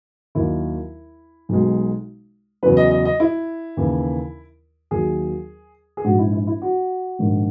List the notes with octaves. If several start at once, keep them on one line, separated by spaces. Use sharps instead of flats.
D#2 D#3 F#3 E4
B1 B2 G#3
E2 C#3 F#3 B4
D#5
D#5
D#5
E4
D#2 C#3 E3
D#2 D#3 F#3 G#4
G#4
A#1 G#2 E3 G#3 F#4
E4
E4
E4
F#4
A#1 G#2 D#3 G#3